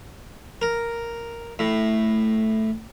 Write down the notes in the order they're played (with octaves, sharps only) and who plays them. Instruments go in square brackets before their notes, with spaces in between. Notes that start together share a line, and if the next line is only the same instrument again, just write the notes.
[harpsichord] A#4
A2